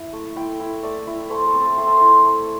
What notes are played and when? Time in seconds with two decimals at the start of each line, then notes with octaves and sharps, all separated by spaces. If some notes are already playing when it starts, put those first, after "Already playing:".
Already playing: E4
0.13 A3
0.36 E4 G5
0.60 E4
0.83 A3 D5
1.07 E4
1.30 A3 C5
1.46 A4
1.54 C4
1.61 A4
1.77 A3 C6
1.87 A5
1.97 E4 C6
2.24 A3